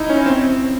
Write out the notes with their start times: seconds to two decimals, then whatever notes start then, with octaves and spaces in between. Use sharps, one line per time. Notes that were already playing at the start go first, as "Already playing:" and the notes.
Already playing: D#4 E4
0.10 C#4
0.26 C4